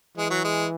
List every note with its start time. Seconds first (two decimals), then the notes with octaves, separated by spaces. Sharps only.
0.17 E3 G#3
0.30 F#3
0.44 G#3